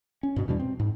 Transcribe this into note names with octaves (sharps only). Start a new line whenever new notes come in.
C#4
G2 B2
E2 B2 G3 D4
C4
G#2